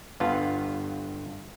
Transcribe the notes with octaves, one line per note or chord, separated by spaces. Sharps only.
G1 G2 B3 F4